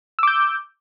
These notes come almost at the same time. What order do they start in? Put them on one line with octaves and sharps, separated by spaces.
E6 D6 G6